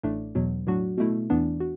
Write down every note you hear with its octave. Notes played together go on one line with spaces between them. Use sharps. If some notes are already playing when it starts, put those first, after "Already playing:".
A1 A2 A3 D4
E2 B2 F#3
A2 F#3 D4 F#4
B2 A3 E4
E2 E3 B3 D4
F#4